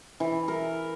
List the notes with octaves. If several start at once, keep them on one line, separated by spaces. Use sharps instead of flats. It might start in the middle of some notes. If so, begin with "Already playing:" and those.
E3
A#4